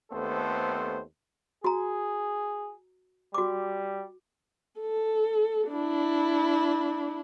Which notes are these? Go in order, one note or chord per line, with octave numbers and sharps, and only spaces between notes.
D#2 A3 B3 C4 A4 C5
F#4 G#4 A#5
G3 F#4 D6
A4
D4 E4